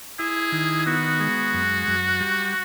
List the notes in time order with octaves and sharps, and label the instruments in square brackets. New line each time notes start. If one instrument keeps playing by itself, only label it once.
[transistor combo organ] E4 [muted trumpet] G#4
[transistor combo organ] D#3
[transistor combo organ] B3 [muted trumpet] F#4
[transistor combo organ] G#3
F#2
F#2
G3